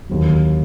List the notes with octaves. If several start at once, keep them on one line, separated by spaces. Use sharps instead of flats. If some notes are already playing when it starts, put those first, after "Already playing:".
D#2 D3 F#3